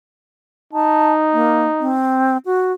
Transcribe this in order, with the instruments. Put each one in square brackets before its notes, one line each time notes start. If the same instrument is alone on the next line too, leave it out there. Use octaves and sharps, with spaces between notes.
[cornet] D#4 [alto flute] A5
[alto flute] A#3
C4
F#4